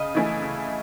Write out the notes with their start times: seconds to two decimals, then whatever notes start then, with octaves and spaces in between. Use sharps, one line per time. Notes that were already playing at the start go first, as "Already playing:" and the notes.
Already playing: C#3 D#5
0.15 E3 A3 E4 G#4
0.42 C#3